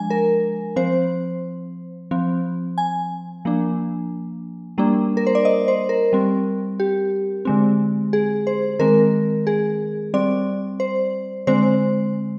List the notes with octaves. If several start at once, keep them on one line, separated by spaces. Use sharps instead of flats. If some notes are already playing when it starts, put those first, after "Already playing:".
Already playing: F3 G#3 D4 G#5
A#4
F3 C4 C5
F3 C4
G#5
F3 A#3 D4
G3 A#3 D4
A#4
C5
D5
D#5
C5
A#4
G3 C4
G4
D3 G#3 C4
G#4
C5
D#3 G#3 C4 A#4
G#4
G3 C4 D5
C5
D3 G#3 C4 C5